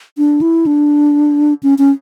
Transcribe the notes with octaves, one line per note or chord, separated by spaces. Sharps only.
D4
E4
D4
C#4
C#4